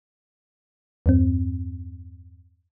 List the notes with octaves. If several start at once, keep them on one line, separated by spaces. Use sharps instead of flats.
E2 G2 C4